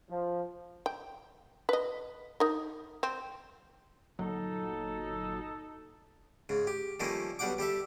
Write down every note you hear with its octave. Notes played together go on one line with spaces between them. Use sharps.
F3
G5
B4 D#5
D#4 A#4
C4
G1 A#2 F#3 D#4 A4
G#2 C#3
G4
D#3 F3 G3 A3 A#3 C#4
B1 G3 D4 F#5 G5 D6
G3 G4 A4 E5